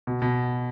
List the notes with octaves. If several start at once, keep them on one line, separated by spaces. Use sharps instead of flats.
B2
B2